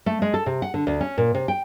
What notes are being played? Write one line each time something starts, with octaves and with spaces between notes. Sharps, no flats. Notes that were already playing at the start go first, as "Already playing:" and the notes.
A3
G#3
A4
C3
F#5
D3
D2
C#4
A#2
C3
G5